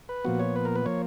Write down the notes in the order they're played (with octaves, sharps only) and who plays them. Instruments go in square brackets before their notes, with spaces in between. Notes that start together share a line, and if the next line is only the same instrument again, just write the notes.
[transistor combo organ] B4
A#2 F3 B3 F#4
C#5
B4
A#4
B4
F3 A#3 C#5